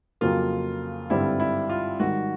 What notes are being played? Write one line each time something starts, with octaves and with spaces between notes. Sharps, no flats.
F2 C#3 F#3 A#3 F4
G#1 G2 D3 G3 C4 E4
E4
F4
G#2 D#3 G3 F#4